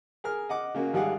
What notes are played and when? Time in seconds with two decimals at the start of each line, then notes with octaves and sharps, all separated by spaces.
0.24 G#4 A#4 F6
0.49 D#5 F#5 D6
0.75 C#3 A#3 F#4
0.93 G#1 D#3 G3 G#4 F5 F#5